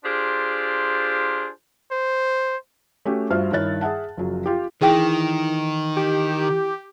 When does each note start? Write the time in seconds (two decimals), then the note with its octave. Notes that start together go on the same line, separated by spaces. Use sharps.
0.05 D4 F4 G4 G#4 C5
1.92 C5
3.05 A3 C#4 F#4 G4
3.30 G2 F4 F#4 C5 E5 F6
3.52 G2 D#3 E4 C#5 F#6 A6
3.81 G#4 E5 F#5 A5
4.17 F#1 F3 F#3
4.46 F4 G4
4.81 D#3 E3 G#4 G5
5.97 G4